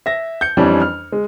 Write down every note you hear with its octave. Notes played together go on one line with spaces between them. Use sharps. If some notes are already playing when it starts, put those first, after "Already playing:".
E5 A#6
G6 C#7
F2 E3 G3 C#4 D4
F6
G#3